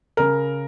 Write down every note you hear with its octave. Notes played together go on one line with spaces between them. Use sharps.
C#3 A#4